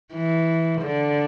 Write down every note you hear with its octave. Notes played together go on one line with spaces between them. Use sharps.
E3
D3